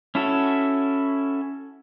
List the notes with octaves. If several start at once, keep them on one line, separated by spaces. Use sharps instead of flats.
C#4 E4 F#4 A4